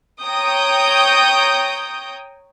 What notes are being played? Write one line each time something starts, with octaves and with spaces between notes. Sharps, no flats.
C#5 G5 A#5 D#6 G6